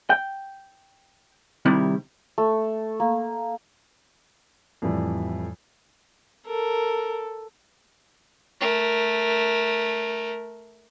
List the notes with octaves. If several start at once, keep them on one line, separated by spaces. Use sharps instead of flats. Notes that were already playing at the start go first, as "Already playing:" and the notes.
G5
C3 D#3 G3 E4
A3
A#3
F2 A2 E3 G3
A4 A#4
A3 A#4